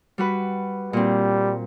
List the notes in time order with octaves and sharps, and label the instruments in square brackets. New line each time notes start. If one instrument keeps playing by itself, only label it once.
[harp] G3 F#4 B4
[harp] A#2 C4 [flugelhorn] G3